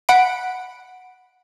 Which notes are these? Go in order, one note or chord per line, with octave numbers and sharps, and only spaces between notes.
F#5 B5 D7